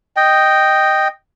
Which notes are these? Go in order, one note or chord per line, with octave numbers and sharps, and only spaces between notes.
D#5 G5